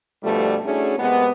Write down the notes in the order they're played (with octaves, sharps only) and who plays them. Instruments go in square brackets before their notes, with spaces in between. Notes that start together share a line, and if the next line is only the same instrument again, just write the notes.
[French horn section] G2 B2 F3 G3 A3
A3 C#4 D4 E4 F#4 G#4
C3 G#3 A#3 B3